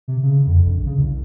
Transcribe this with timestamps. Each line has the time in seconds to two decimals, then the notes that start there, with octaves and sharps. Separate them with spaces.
0.08 C3
0.23 C#3
0.47 F2
0.65 A#1
0.86 C#3
0.97 C2